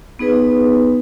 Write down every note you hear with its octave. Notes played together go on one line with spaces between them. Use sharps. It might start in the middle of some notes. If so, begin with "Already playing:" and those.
B3 D#4 G#4 B4